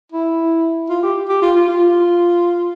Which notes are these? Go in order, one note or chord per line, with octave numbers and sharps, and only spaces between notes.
E4
F4
G4
G4
F4
F4
F4